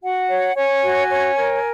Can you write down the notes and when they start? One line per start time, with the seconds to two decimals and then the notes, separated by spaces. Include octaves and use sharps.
0.03 F#4 F#5
0.30 C#5
0.57 C#5 G#5
0.83 F#4
1.10 C#5
1.37 A#4